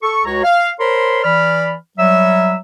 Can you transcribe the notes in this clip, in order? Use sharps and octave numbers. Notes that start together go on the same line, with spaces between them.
A4 C#6
C#2 F#4 C#5 A#5
F5
A#4 C5 C#5 B5 C6
E3 D5 B5 F6
F#3 G3 E5 E6